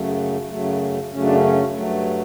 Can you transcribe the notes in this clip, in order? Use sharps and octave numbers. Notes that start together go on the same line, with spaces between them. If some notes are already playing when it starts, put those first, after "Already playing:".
Already playing: F#2 C#3 F#3 A3
F#2 C#3 F#3 A3
F#2 C#3 F#3 A3 C#4
D4
C#4
G2 F#3 A3